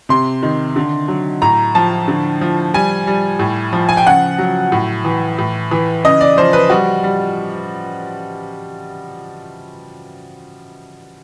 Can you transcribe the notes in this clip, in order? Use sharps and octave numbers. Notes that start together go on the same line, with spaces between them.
C3 C6
D#3
D3
F#3
A2 A#5
F3 A5
D3
F3
G3 G#5
G3
A2
F3
G#5
G5
C#3 F#5
F#3
A2
E3
A2
E3
C#3 D#5
D5
F3 C5
B4
G3 F#4
G3